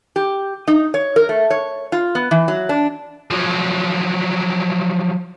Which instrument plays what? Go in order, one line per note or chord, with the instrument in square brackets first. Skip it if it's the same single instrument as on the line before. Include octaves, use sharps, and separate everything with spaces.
[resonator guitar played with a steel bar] G4
D#4
C#5
A#4
A3
C#5
F4
B3
E3
F#3
D4
[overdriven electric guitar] F3 F#3